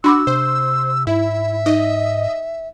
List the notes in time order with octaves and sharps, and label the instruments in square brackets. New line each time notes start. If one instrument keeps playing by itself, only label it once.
[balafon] D4 B5 D6 [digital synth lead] F#4 [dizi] E6
[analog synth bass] C3 [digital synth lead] C5
[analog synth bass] G#2 [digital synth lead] E4 [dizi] E5
[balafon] D#4 [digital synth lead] D#5